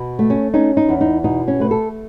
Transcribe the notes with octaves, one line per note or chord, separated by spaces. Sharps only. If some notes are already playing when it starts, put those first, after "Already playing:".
Already playing: B2
A3
C#4
C#4 D#4
D#4
E2
D#4
B2 D#4
C#4
A3 B4
A4